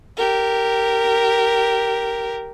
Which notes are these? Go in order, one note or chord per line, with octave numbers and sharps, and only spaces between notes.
G4 A#4